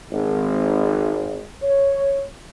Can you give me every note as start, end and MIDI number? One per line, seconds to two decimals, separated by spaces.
0.11 1.44 32
1.63 2.23 73